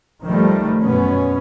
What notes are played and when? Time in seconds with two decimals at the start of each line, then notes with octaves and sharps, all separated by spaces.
0.23 D#3 F3 G3 A3
0.82 F#2 B2 B3 C#4